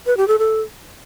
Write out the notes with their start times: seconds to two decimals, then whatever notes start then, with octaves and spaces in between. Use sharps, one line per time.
0.06 B4
0.17 G4
0.28 A4
0.39 A4